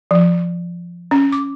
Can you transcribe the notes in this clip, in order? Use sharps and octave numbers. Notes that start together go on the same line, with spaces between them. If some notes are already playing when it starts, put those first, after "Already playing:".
F3
C#4
D6